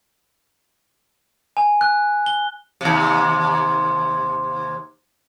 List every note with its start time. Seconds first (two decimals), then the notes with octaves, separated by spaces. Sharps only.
1.57 G#5
1.81 F#6
2.26 G7
2.81 D#2 C3